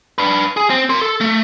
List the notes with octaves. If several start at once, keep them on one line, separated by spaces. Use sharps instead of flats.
D4 B4
G#4
C4
A#4 C6
A4
A3